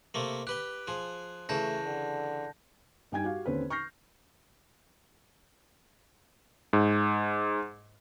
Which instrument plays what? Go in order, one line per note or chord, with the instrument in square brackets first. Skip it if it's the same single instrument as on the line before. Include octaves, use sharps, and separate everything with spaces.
[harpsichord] C3 A3 A#3
[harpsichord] G4 B4 G5 [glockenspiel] F#6
[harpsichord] F3 G#4
[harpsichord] C#3 E3 [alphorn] A3 [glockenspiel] A5 G6 A#6
[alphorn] D3
[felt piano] G2 G3 D#4 G5 G#5 G#6
F#4 G4 F5
D#2 D3 C4 C#4 B4
C#6 F6 G6 A#6 C7
[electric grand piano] G#2